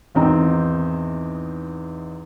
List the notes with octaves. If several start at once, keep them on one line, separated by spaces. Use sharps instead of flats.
G#1 E2 C4 D#4